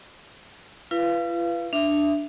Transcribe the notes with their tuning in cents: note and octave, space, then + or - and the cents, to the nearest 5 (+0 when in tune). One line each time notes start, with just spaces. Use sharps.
F4 -45 B4 +0 F5 -25
D4 +5 E5 +10